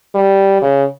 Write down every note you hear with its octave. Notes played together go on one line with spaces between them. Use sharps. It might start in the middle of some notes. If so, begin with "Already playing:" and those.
G3
C#3